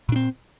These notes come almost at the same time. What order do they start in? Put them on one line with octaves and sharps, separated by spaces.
A#2 D4 C4